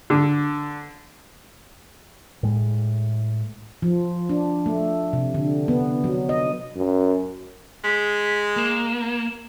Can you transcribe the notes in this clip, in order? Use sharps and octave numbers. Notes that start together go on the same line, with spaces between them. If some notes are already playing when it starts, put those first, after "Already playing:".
D3
A2 G#3
F3
D4
A3
C3
D3
B3
F#3
D#5
F#2
G#3 B6
A#3 E7